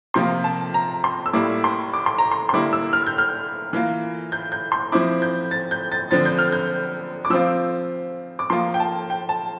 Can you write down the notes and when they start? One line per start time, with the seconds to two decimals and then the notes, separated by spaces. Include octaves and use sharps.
0.14 C3 F3 A#3 F4 C6
0.44 A5
0.74 A#5
1.04 C6
1.26 E6
1.33 A2 G3 A#3 E4 D6
1.64 C6
1.93 D6
2.06 C6
2.19 A#5
2.32 C6
2.49 C6
2.53 D3 G3 A#3 E4 D6
2.73 E6
2.93 F6
3.07 G6
3.18 F6
3.73 E3 A#3 F4
4.32 G6
4.52 G6
4.72 C6
4.92 F3 C4 E4 D6
5.22 G6
5.51 A6
5.71 G6
5.92 A6
6.11 D3 F3 C4 A6
6.25 G6
6.38 F6
6.52 G6
7.25 D6
7.30 F3 C4 F4 E6
8.39 D6
8.50 F3 A#3 F4 C6
8.74 G5
8.80 A5
9.10 G5
9.29 A5